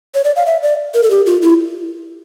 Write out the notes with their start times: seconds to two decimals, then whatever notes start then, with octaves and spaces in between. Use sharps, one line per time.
0.15 C#5
0.25 D5
0.36 F5
0.46 E5
0.63 D5
0.94 A#4
1.03 A4
1.10 G4
1.26 F4
1.42 E4